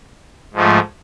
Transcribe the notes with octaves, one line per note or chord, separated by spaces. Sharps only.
G#2 F3 A3